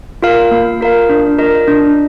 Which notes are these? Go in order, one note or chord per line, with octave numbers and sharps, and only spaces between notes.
F4 A#4 F5
A#3
F4 A#4 F5
D4
F4 A#4 D#5
D4